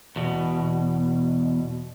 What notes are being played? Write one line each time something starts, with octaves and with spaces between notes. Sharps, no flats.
E2 B2